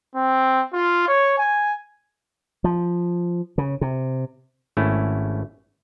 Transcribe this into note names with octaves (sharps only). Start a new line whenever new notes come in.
C4
F4
C#5
G#5
F3
C#3
C3
G#1 A3 C#4 E4